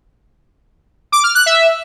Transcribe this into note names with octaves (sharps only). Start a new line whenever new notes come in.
D6
F6
F#6
E5